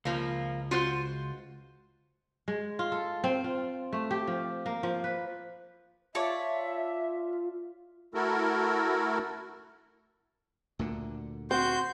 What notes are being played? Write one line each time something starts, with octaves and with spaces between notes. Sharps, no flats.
C#2 F3 A#3
F4 F#4 C5
G#3
F4
A4
C4
F4
A3
G4
F3
A#3
F3
B4
F4 C#5 D5 E5 A5
A3 E4 F#4 A4 A#4
D2 A#2 D3
C4 F#4 C6 G6